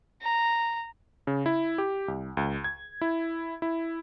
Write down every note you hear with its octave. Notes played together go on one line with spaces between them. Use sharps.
A#5
C#3
E4
G4
C2
C#2
G#6
E4
E4